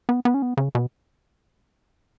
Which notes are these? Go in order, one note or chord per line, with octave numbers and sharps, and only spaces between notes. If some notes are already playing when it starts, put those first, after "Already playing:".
B3
B3
C#4
B3
C#3
B2